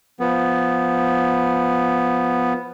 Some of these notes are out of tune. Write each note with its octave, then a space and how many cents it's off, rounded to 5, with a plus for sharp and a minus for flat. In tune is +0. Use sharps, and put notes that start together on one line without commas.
F3 +0 B3 +0